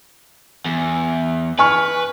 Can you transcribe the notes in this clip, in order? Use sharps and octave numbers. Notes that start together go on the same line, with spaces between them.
E2
B4 G#5 C#6 F6